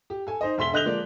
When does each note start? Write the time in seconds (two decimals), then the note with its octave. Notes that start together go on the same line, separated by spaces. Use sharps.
0.10 G4
0.27 A4 G#5
0.41 D#4 C5 D#5
0.58 E1 E5 C6 B6 G7
0.73 D3 D#5 F#6 G6 F7 G7
0.85 F3 G#3 A#3 D5